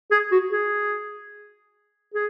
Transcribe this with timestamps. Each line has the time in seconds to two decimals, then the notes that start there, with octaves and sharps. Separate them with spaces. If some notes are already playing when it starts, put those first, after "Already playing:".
0.11 G#4
0.32 F#4
0.52 G#4
2.14 G#4